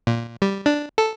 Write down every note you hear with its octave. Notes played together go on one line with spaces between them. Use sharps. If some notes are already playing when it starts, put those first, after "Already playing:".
A#2
G3
D4
A4